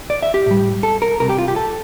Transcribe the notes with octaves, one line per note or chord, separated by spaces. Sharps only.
D5
E5
G4
A2 G3
A4
A#4
C2 C3 G3 A#4
G4
F4
G4
A4